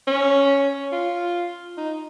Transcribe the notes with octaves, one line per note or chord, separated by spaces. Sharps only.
C#4
F4
D#4